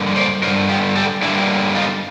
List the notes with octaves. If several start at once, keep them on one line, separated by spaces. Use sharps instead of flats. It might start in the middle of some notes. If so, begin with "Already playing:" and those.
Already playing: G2 D3 G3 A#3
C5 D5
G2 D3 G3 A#4 C5
F4 G4
G4 A4
G2 D3 G3 A#3 D4 E4
D#4 F4